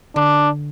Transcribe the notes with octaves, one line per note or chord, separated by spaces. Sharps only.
D3 D4